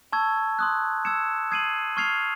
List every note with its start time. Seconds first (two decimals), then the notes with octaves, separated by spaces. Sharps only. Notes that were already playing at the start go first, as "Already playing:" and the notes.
0.12 A5 C#6 E6 G#6
0.59 C6 D#6 F#6
1.05 E6 G#6 C#7 E7
1.51 D#6 G#6 C7 D#7 F#7
1.97 C#6 F6 G#6 C7 F7